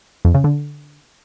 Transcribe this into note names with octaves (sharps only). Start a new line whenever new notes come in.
F2
C#3
D3